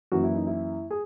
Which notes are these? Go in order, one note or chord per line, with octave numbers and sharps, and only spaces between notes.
F#2 E3 A#3 F#4
E4
D#4
E4
G#4